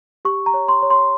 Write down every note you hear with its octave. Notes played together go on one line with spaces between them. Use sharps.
G4 C#6
A#5
C#5
C6
C#5
C6